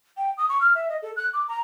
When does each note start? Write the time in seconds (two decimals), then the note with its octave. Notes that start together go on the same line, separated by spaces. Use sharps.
0.17 G5
0.38 D#6
0.49 C#6
0.61 F6
0.75 E5
0.89 D#5
1.02 A4
1.17 F#6
1.33 D6
1.48 A#5